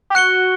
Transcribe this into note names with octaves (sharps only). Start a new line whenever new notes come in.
G4
F#4 F#6 C#7 G7